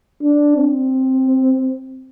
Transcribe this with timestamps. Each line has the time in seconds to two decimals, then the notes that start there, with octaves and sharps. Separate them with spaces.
0.23 D4
0.57 C4